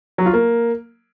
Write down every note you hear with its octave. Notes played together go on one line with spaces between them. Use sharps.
F#3
F4
A#3